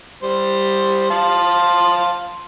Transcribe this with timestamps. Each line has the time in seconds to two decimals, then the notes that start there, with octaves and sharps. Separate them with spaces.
0.23 G3 C5
1.10 F5 A5 C6